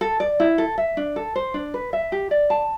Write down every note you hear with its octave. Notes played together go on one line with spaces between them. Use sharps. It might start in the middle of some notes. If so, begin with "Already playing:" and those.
A4
D5
E4
A4
E5
D4
A4
C5
D4
B4
E5
G4
D5
A5